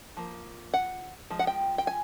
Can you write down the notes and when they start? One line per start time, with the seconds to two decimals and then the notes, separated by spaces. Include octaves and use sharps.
0.17 F3 A#3
0.74 F#5
1.30 F3 G#3
1.39 F#5
1.47 G5
1.78 G5
1.87 G#5